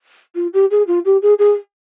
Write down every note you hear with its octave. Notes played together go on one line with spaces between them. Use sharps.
F4
G4
G#4
F4
G4
G#4
G#4